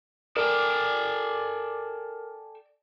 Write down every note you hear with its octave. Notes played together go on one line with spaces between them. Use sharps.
A4 A#4 D5 G5 G#5